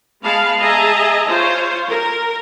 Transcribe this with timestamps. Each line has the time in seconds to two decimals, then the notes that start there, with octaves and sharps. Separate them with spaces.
0.23 G#3 B3 F5 A5 B5
0.58 G#4 D#5 E5 A5 A#5
1.27 F4 C5 C#5
1.89 A#4